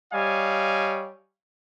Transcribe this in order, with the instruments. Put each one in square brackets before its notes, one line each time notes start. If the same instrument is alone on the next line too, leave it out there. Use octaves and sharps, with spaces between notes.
[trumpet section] G3 C#5 D#5 F5 G#5